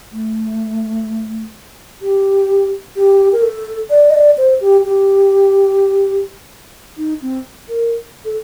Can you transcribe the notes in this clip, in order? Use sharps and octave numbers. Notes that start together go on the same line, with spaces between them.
A3
G4
G4
A#4
A4
D5
D#5
D5
C5
G4
G4
D#4
C4
A#4
A4